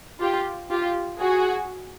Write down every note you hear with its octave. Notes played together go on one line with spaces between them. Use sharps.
F4 G4
F4 G4
F#4 G#4